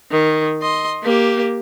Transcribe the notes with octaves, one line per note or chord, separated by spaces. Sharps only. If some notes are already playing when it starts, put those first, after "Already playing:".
D#3
D#5 C6
A#3 G4